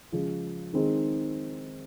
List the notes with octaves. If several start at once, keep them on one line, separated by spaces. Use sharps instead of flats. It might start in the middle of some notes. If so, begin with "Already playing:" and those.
C#3 F3 G#3
D#3 G#3 C4 D#4